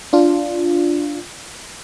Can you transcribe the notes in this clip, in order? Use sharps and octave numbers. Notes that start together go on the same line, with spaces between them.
D4 F4